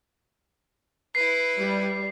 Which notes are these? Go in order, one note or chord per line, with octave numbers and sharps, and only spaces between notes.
E4 B4 C7
G3